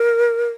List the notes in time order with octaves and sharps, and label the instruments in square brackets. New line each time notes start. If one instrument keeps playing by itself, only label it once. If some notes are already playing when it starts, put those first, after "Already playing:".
Already playing: [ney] A#4